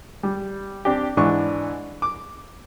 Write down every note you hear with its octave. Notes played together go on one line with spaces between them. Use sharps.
G3
C4 D4 G4
G#2 E3 D4 C#6
D6